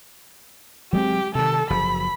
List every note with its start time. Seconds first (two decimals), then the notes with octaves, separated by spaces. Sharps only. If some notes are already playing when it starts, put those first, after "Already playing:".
0.93 F#3 G#3 C4 G4
1.35 C3 D#3 A4
1.70 F#1 F3 B5